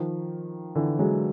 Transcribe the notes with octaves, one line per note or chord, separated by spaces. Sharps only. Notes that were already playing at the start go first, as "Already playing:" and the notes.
Already playing: D#3 F3
D3 E3
F#3 G#3